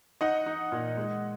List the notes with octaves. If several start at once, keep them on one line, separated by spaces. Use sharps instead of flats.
D#4 D#5 F#5
D#4
A#2
G#3